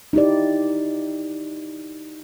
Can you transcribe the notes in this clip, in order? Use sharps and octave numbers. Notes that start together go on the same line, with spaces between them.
D#4 E4 G4 D5